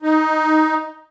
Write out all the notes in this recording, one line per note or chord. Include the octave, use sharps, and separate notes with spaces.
D#4